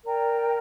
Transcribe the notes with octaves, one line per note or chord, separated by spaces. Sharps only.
A#4 D5 G5 A#5